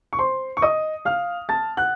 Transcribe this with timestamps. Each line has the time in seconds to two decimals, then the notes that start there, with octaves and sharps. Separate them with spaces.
0.13 C#6
0.19 C5 C6
0.57 C#6
0.62 D#5 D#6
1.05 F5 F6
1.49 A5 A6
1.77 F#5 F#6